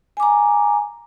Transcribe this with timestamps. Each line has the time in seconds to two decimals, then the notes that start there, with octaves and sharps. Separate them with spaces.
0.17 G#5
0.20 D6
0.23 A#5